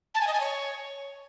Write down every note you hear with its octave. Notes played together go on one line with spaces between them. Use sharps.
A5
G#5
D#5
G#5
C#5